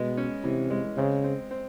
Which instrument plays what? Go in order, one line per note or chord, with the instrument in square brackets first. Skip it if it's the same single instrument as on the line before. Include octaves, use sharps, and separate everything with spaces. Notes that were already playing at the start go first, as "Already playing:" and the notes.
Already playing: [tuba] B2 [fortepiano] G#3 B3
[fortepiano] C#4
[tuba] C3 [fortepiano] E3
[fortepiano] G#3
[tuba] C#3 [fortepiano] C4
[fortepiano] C4
C4